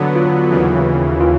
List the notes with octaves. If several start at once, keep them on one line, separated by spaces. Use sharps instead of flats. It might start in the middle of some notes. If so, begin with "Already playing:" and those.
Already playing: D3 F#3 B3
F4
D#2 C#3 E3
F4